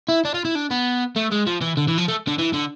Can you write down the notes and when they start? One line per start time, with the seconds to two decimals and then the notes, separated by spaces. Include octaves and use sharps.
0.09 E4
0.25 D4
0.34 F4
0.45 E4
0.55 D4
0.71 B3
1.16 A3
1.32 G#3
1.47 F3
1.61 E3
1.77 D3
1.88 E3
1.98 F3
2.08 A3
2.28 D3
2.39 E3
2.54 D3